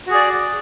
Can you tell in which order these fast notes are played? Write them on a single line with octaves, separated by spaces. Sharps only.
F#4 G#4 D5